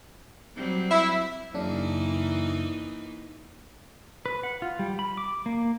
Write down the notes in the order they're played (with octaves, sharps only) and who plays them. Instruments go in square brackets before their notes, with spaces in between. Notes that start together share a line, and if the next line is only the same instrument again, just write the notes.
[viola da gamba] F#3 G3 C4
[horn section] E4 [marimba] E5
[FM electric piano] F#2 C#3 D4 [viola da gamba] E3 A#3 D#4
[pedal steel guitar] B4
F#5
F4
G3
B5
D6
A#3